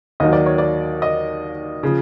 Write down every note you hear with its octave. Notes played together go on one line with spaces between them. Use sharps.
D#2 D#3 F#3 D#5
D5
C#5
D5
D#5
C#3 F3